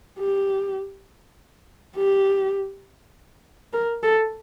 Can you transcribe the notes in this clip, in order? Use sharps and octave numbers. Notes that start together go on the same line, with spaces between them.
G4
G4
A#4
A4